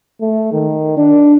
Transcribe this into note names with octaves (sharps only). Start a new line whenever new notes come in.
A3
D#3
D4